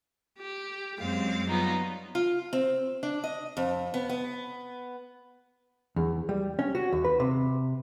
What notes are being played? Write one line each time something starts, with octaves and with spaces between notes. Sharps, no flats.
G4
F#2 G#3 C4 F5
F#3 G3 B3 D#4 F4
F4
C4
D4
D#5
F2
B3
B3
E2
G3
C#4
F#4
D#2
B4
C3